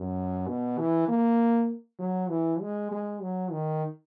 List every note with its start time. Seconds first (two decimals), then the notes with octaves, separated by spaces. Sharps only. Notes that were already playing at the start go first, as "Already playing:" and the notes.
Already playing: F#2
0.47 B2
0.78 E3
1.08 A#3
1.99 F#3
2.30 E3
2.61 G#3
2.91 G#3
3.22 F#3
3.52 D#3